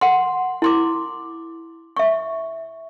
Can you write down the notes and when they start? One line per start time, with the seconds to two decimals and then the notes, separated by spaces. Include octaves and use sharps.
0.01 F#5 C6
0.62 E4 C6 D6
1.97 E5 C#6